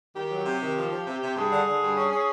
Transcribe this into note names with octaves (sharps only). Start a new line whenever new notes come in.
D#3 G4
F#3
C3
D#3
F3
F3
C3
C3
G2 G#4
D3
D3
G2
C#4
C#4